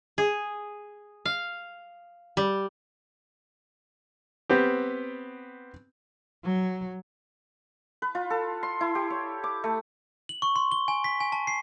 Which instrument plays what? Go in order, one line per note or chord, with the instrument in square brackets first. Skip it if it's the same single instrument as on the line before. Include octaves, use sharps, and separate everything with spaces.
[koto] G#4
F5
G3
[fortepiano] B3 C4 G4
[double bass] F#3
[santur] B4
F4
A4
C6
E4
G4
C#5
D6
A3
[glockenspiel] F#7
C#6
C6
G7
G#5
B6
G#5
A5
C7